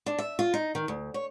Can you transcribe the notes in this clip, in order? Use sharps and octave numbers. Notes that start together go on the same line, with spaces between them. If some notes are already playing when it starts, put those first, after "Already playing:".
D4
E5
F4
D#4
D#3
D2
C#5